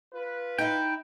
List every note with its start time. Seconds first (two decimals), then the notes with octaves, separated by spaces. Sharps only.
0.13 F4 B4
0.58 D#4 E4 G5